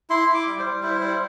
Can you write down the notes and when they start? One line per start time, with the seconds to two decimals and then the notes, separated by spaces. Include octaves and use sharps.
0.10 E4 C6
0.28 E4
0.34 D6
0.46 G3
0.59 C5
0.65 G3
0.82 E4 C5
1.01 G3 C5